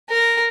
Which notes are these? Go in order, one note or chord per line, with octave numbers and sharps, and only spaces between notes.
A#4